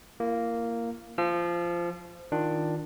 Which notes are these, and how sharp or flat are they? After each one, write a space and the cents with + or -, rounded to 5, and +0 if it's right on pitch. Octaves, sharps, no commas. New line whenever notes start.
A#3 -5 E4 +45
F3 -15 E6 +45
D#3 +0 D4 +10 F4 +0